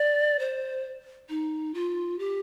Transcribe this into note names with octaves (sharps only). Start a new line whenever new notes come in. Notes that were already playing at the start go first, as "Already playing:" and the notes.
Already playing: D5
C5
D#4
F4
G4